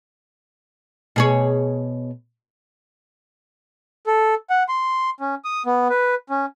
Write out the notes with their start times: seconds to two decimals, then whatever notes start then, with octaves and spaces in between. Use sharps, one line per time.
1.16 B2 G#4 C#5
4.07 A4
4.50 F#5
4.69 C6
5.20 C#4
5.45 D#6
5.66 B3
5.90 B4
6.30 C#4